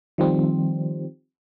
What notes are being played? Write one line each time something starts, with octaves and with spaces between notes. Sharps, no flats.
D#3 F3 G3 C4